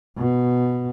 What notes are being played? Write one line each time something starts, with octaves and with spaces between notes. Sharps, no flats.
B2